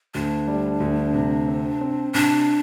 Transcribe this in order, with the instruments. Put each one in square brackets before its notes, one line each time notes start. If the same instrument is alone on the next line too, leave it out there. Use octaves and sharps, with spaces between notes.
[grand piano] D2 [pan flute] D4
[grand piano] G3
D2
C3
C4
C4
[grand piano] C3 [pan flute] D4